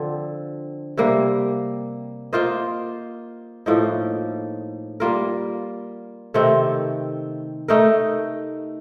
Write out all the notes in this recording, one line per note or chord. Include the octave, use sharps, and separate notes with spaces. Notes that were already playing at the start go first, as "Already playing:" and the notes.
Already playing: D3 F3 C4
C3 G3 A#3
A#3 F4 C5 D#5
A2 F3 A#3 D#4
G3 A#3 F4 A#4
C3 D#3 A3 C4
A3 D#4 A#4